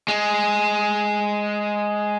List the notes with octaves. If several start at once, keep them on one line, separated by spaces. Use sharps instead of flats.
G#3